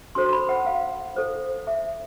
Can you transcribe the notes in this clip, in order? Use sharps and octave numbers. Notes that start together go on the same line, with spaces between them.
D4 F#4 A4 C5 C6
C6
B5
F#5
F5
E4 A4 C5
E5